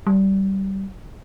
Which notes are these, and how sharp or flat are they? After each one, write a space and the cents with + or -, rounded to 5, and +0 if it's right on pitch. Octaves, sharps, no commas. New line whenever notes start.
G3 -20